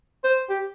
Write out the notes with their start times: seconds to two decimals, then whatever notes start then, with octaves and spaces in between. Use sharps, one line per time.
0.24 C5
0.49 G4